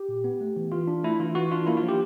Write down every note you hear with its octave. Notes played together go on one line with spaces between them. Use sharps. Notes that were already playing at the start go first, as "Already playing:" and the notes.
Already playing: G4
A#2
B3
A3
E3
E3 F4
D4
A3 E4
E3 F4
E3 F#4
D4 F4
A#3 E4
F4
F3
G4